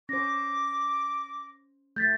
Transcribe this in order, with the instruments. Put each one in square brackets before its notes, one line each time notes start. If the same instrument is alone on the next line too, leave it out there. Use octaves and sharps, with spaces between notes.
[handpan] C#4 C5 [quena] D6 [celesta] A#6
[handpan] A3 [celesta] G6 A6 B6